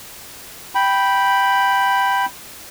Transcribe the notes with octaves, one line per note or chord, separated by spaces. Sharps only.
G5 B5